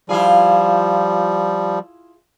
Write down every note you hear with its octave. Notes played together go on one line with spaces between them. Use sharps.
F3 G3 E4 F4 G#4